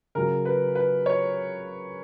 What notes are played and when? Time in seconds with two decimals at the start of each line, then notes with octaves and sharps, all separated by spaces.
0.15 C#3 F#3 A#4
0.45 B4
0.75 B4
1.06 C#5